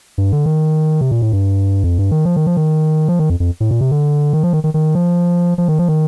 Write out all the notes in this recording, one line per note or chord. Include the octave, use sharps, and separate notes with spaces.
G2
D3
D#3
C3
A#2
A2
G2
F2
G2
D#3
F3
D#3
F3
D#3
F3
D#3
F2
F2
A2
A#2
C3
D3
D#3
F3
D#3
D#3
D#3
F3
F3
D#3
F3
D#3